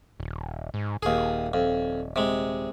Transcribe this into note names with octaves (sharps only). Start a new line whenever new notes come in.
D#1
G#2
D#1 D#2 G#4
F2
C3 G#3